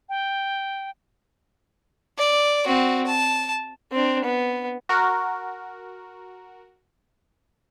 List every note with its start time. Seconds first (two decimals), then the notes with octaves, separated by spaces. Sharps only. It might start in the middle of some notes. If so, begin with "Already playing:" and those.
0.09 G5
2.18 D5
2.66 C4 F#4
3.06 A5
3.93 C4 D4
4.24 B3
4.89 F#4 A#4